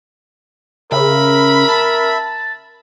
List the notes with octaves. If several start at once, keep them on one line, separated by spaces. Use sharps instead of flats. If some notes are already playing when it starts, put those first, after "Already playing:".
C#3 A#4 E5 B5
A5